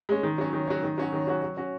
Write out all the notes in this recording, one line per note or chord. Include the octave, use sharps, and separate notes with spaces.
G#3 C#4
D#3
F#3 C#4
D#3
F#3 C#4
D#3
F#3 C#4 F#4
D#3
F#3 C#4 F#4
F#3
C#4 F#4